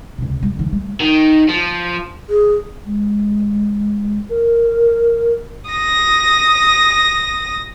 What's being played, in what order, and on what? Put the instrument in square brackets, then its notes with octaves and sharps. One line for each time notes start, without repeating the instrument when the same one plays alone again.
[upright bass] C#2 C3
G3
D3 E3
G3 A3
[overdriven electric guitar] D#3
F3
[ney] G#4
[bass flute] G#3
A#4
[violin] D#6 A#6